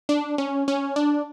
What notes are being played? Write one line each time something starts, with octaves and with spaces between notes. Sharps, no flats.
D4
C#4
C#4
D4